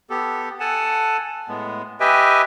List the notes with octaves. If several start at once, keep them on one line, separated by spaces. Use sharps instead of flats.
B3 G4 A4
A4 F#5 G#5 A5
A2 G#3 B3
G4 B4 D#5 E5 G5 G#5